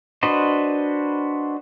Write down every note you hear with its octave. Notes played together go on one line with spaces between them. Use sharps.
D4 F#4 B4 C5 D#5